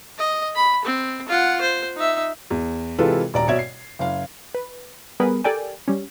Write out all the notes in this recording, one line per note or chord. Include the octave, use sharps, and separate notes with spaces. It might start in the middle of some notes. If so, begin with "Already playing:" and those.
D#5
B5
C4
F4 F#5
C5
D#4 E5
E2
C3 E3 G#3 F4 A4 B4
D#1 D5 A#5
B2 C#5 D5 E5 G#6
C7
F#1 F5
B4
G3 B3 G#4 A#4 B4
G4 A4 A#4 D5 G5 G#5
G3 C#4